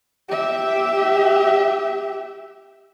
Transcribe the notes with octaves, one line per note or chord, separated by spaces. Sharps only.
G4 E5